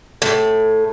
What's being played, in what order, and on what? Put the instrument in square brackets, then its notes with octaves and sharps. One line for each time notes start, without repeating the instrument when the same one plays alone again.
[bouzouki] A2